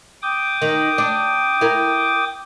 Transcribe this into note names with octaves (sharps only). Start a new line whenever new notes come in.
G5 D6 D#6
D#3
D4
E4 A#4